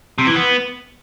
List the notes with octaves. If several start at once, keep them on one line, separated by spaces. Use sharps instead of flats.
C3
E3
B3